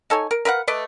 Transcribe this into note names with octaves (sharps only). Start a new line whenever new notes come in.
D#4 A4 C#5 G#5
A#4
A#4 B4 F5 F#5
A3 B4 D5 D#5